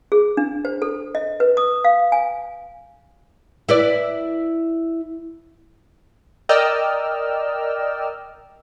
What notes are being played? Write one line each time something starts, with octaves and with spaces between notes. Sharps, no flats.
G#4
D4
C5
A4
D#5
B4
D#6
F5
G#5
E4 B4 D5
A#4 D5 D#5 G5 E6 F6